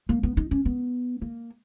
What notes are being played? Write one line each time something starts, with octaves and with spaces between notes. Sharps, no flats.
A#3
B3
D#4
C#4
B3
A#3